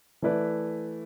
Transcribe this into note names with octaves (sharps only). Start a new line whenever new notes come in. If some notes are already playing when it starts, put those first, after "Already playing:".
E3 A3 E4 B4 D5